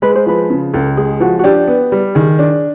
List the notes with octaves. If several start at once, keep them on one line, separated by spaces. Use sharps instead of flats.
G#3 B4
C5
F3 B4
C#3
C#2 A4
G#3 G#4
F3 F#4
F#4
D4 G4
B3
G3
D#3 G#4
D4